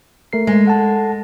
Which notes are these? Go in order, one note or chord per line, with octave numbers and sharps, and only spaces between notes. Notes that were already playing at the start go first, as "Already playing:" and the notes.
A3 A#4 C7
G#3
A4 F#5 A5